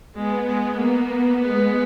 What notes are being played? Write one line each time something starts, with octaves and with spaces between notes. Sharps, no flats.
G#3 B3
G#3
A#3
G#3 B3